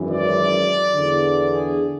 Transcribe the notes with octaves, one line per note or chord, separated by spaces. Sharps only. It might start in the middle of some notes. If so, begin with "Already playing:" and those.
Already playing: G#1 F#2 E3
D5
E2 D3
G#4